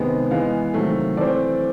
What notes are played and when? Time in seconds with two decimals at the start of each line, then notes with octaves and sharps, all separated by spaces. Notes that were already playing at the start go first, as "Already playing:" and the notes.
Already playing: C3 D#3 G#3 B3
0.31 E3 G#3 B3 F5
0.74 C3 D#3 F#3 A3
1.17 E3 A3 C4 D5